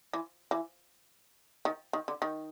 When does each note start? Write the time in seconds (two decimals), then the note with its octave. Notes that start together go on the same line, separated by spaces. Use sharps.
0.13 E3
0.51 E3
1.65 D#3
1.93 D#3
2.08 D3
2.22 D#3